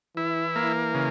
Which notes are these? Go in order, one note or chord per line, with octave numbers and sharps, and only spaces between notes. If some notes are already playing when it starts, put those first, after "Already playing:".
E3 E4
A#3
C#3